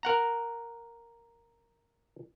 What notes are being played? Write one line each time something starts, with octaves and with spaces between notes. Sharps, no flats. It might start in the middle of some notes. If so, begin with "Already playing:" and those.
A#4 F#5 A#5